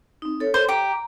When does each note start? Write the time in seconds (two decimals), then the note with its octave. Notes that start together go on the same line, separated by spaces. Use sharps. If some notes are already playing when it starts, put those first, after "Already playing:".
0.22 C4 D#4
0.40 A4 C#5
0.54 C5
0.69 G4 A#5